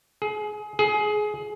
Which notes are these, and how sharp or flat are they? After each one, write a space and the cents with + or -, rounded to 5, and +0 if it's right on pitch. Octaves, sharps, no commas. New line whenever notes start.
G#4 +25
G#4 +20